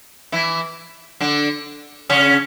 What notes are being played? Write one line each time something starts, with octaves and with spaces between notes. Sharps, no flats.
E3 E4
D3 D4
C#3 C#4